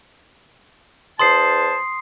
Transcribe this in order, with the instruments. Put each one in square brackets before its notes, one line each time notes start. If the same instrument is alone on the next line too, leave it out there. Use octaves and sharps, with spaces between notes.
[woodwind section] E2 C5 A5 [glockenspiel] C6 D#6 C7